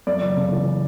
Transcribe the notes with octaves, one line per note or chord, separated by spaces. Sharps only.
F#2 D5
F#1
C#3
E3